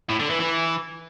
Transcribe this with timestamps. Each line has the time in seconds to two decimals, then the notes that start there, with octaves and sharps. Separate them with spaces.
0.09 A2
0.20 D3
0.30 E3
0.40 E3